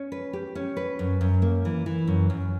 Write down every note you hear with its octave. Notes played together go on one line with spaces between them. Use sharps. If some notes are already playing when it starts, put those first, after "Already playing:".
Already playing: C#4
B4
G4
C#4
B4
F#2
F#2
A#3
E3
E3
F#2
F#2